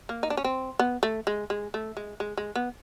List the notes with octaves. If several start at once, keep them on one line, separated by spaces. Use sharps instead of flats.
A#3
D#4
D4
C#4
C4
B3
A3
G#3
G#3
A3
G#3
G#3
G#3
B3